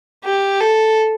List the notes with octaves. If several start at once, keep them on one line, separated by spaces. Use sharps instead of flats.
G4
A4